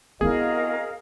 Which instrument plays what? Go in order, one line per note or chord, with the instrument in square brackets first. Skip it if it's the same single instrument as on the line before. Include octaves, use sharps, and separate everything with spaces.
[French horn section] F2 F#4 D#5 [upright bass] B3 E4 [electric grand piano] G#4 [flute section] A#4 F5